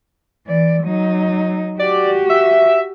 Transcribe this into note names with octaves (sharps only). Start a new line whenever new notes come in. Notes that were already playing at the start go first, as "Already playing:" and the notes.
E3 D5
F#3 D#4
F#4 G4 D5
E5